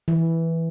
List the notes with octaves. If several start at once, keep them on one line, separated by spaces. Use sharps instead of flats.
E3